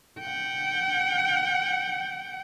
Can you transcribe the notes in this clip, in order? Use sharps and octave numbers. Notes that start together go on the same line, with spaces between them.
F#5 G5